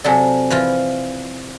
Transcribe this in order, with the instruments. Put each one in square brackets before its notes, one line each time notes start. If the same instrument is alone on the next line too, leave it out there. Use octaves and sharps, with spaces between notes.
[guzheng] C3 F#3 A4 [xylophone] D5 G#5
[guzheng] E3 F3 F4